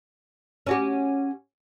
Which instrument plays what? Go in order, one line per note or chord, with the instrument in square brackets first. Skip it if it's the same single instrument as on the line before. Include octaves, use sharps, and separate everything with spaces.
[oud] C#4 F#4 G4